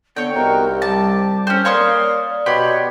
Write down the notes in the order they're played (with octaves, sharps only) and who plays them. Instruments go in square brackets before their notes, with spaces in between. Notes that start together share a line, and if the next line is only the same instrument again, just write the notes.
[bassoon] D3 [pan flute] B3 [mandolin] C#5 G5
[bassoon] C2 [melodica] D#4 F#4 [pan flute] A#4
[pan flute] G3 [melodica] G4 [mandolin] A5
[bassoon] C4 [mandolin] C#4 C5
[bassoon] A#3 [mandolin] C#5 C6 D#6 [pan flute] D5 [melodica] F5
[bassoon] B2 [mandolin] G4 B5 C6 [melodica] C#5 F#5